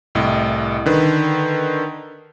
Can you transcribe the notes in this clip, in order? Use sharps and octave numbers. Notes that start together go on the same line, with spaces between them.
C2 A2 D#5
D3 D#3 B4